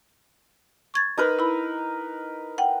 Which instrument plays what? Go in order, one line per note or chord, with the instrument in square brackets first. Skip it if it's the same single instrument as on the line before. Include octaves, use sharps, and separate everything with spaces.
[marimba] C#6 G#6 A6
[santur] D#4 A#4 B4
[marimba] E4 B5
F#5 G5